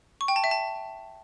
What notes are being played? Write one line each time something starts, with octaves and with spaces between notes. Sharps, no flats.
C#6
G5
A5
E5
A5